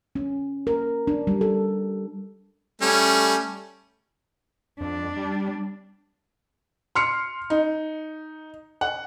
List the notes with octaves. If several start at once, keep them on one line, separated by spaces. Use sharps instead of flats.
C#4
A#4
D4
G3
A4
G3 A3 C#4
F2 D4
G3
C6 F6 C#7
D#4
F#5